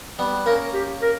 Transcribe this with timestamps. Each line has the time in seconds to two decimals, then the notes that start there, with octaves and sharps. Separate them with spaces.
0.19 G3 B3
0.46 A#3 C#4 A#4
0.73 G4
1.02 A#4